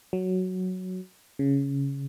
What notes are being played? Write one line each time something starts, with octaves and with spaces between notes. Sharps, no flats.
F#3
C#3